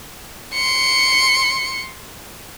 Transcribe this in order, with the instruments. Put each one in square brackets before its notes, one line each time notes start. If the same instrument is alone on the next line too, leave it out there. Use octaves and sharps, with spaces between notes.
[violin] C6 C#7